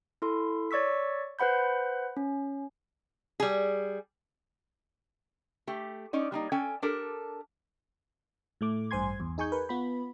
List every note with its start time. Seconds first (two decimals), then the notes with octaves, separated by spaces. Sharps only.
0.22 E4 A4 C6
0.71 C#5 D5 C#6 E6 B6
1.39 B4 C5 F#5 B5 G6
2.17 C#4
3.40 G3 G#4
5.67 A3 G4
6.13 C#4 D#4 D5
6.32 G3 A#3 D#4
6.52 C#4 A4 G5 G#5
6.82 D4 G4 A4 A#4
8.61 A2 A3 D6
8.91 A1 G2 C5 G#5 C6 G#6
9.20 E2
9.38 D#4 G#4 G#5 C#6 G6
9.52 A#4 B4
9.69 B3 F4 B5